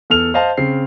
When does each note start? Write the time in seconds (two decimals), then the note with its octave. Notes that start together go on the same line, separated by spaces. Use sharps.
0.10 E2 A4 F6 F7
0.34 C5 D#5 F5 A5
0.57 C#3 C4 C7